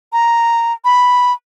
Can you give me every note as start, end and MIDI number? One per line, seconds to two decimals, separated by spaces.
0.13 0.73 82
0.85 1.33 83